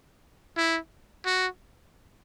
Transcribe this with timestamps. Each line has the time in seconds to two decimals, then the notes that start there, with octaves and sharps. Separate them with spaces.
0.57 E4
1.26 F#4